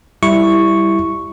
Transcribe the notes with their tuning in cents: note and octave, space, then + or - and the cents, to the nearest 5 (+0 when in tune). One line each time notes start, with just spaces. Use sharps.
G3 +0 E4 +0 C#6 +0